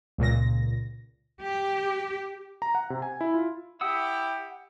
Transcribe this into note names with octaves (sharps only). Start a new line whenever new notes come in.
C#2 A#2 A#6
G4
A#5
F#5
C3
G#5
E4
F4
E4 G4 F#5 D#6 E6